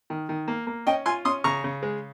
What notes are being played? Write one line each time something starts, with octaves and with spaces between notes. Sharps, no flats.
D#3
D#3
A#3
A#3
C#4 D#5 G5
F4 G#5 C6
C#4 C6 D#6
C#3 A#5 C#6
C#3
G#3